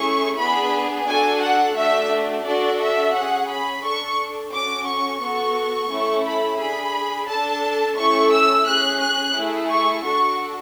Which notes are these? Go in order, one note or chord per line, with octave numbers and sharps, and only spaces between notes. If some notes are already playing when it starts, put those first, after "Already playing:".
Already playing: A3 C#4 E4 G#4 C#6
B3 D4 G#4 B5
D4 F#4 A4 G#5
F#5
A3 D4 F#4 E5
D4 F#4 A4 D5
E5
C#4 G#4 F#5
B5
D4 A4 C#6
C#4 F#4 A4 D6
C#6
B3 F#4 A4 C#6
A3 C#4 E4 A4
B5
D4 G#4 B5
D4 A4 A5
A3 C#4 E4 A4 C#6
E6
C#4 G#4 F#6
F#6
A3 E4 G#4
C#6
D4 F#4 A4 C#6